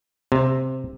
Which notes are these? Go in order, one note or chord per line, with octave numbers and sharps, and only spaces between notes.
C3